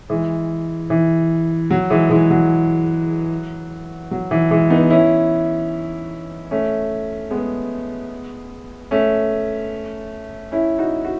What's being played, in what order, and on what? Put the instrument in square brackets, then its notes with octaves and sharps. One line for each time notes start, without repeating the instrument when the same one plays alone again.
[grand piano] E3 G#3
E3
F#3
E3 G#3
E3 G#3
F#3
F#3
E3
E3 G#3
B3 D#4
C#4 E4
A3 C#4
G#3 B3
A3 C#4
C#4 E4
D#4 F#4
F#4